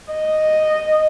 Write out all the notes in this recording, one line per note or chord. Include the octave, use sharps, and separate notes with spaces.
D#5